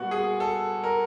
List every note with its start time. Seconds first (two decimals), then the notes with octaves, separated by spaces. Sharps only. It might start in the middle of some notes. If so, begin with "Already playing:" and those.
Already playing: A#2 G3 B3 F#4
0.11 G#4
0.40 A4
0.84 A#4